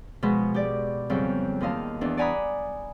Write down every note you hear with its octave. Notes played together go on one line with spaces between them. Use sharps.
B2 F3 G#3 B3
G4 D5
F2 C#3 F#3 G3 G5
D#2 F4 D#5 F5 A5
E2 D4
D5 F#5 G#5 A#5 B5 D#6